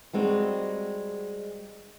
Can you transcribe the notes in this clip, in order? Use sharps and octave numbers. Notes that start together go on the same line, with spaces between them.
G3 G#3 C4 D#4 F#4